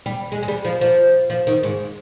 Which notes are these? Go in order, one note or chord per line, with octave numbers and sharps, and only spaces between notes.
G3
G#3
G#3
G3
F3
F3
F3
D#3
G#2